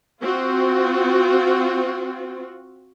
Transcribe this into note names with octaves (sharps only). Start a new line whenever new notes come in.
C4 F4 F#4